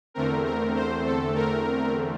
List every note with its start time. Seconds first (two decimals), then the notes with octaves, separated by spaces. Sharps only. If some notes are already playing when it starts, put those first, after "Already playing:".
0.14 E2 D3 A3 C4 A#4
0.46 A#4
0.75 C5
1.06 A4
1.35 A#4